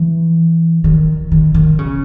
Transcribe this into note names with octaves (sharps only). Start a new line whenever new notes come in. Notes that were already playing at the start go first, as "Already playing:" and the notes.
Already playing: E3
D#3
D#3
D#3
C#3